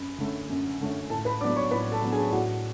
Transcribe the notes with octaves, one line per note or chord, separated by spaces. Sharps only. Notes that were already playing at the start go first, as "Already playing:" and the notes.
Already playing: F#2 B5
D3 A3 C#4
F#2
D3 A3 C#4
A2 A4 A5
B4 B5
F#3 B3 D4 D5 D6
C#5 C#6
A2 B4 B5
A4 A5
F#3 B3 D4
G#4 G#5
A2 F#4 F#5